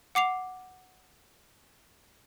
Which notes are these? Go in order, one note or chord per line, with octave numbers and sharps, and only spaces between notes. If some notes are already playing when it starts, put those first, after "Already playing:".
F#5 D6 C7 F7